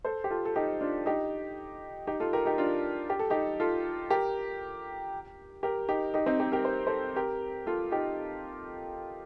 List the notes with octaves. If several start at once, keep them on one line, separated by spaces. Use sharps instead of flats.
A4 C5
G4
F4 A4
A4
D#4 G4
D4 F4
D#4 G4
D#4 G4
F4 A4
G4 A#4
D#4 G4
D4 F4
G4
A4
D#4 G4
F4 A4
G4 A#4
G4 A#4
D#4 G4
D#4 G4
C4 D#4
D#4 G4
G4 A#4
C5
A4 C5
G4 A#4
F4 A4
D#4 G4